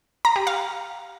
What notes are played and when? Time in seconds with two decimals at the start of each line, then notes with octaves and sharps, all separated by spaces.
0.25 A#5
0.36 G4
0.47 F5